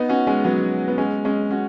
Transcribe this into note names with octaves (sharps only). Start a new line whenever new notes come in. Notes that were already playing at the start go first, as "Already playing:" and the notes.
Already playing: B3 D#4
C#4 F#4
G#3 C#4
F#3 B3
B3
G#3 C#4
G#3 C#4
C#4 F#4